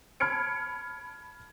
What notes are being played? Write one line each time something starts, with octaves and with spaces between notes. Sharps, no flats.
A5 B5 F6 G#6 C#7 D7